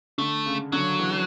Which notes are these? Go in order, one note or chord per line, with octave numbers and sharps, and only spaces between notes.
D3 A3
C#3
D3 F#3
E3